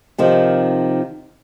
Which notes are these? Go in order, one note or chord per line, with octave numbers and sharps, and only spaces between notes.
C3 D#3 F3